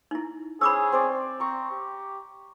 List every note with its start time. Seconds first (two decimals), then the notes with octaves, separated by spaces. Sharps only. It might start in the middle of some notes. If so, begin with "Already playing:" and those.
0.11 D#4 E4
0.61 C#4 G#4 C5 B5 D6 E6
0.92 C4 C5 D5
1.40 C4 A#5 C#6
1.71 G4